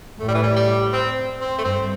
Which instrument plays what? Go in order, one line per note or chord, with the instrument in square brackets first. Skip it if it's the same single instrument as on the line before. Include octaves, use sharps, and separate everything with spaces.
[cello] A2 [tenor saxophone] A3
[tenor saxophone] G3
E3
G3
G3
C4
C4
A3
[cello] G2 [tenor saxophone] C4